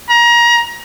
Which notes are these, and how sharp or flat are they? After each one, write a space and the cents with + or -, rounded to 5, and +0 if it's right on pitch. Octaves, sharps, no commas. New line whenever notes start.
A#5 +30